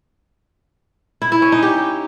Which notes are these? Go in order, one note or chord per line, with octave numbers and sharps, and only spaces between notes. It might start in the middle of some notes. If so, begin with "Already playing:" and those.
E4
E4
C#4
D#4
G4